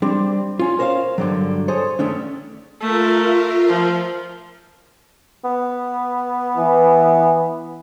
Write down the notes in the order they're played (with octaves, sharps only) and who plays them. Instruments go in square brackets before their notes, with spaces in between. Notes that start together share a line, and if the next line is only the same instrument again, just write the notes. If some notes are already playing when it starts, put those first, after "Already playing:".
[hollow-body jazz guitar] G3 C4 D4
C#4 F4
A#4 C5 C#5 E5 F5
G2 D3 F#3
G#4 A4 C5 C#5
D#3 A3 C#4 D4
[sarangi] A3 [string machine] F4 A#4 E5
[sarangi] F3
[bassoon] B3
[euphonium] E3